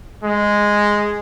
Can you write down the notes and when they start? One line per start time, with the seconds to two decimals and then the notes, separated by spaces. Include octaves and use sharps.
0.23 G#3